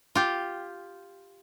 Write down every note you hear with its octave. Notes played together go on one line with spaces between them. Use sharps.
F4 G4